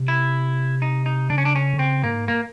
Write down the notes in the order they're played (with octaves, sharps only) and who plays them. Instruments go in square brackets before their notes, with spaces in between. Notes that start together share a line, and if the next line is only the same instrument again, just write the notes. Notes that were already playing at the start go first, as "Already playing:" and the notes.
Already playing: [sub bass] C3
[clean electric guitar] E4
D#4
D#4
[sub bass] C#3 [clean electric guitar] D4
[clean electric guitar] C#4
D4
C#4
[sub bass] D3
[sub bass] C#3 [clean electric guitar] C4
[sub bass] G#2 [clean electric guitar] A#3
[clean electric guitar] A#3